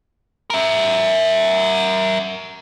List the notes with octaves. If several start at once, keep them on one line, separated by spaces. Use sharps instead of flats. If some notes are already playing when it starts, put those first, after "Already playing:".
A#4 E5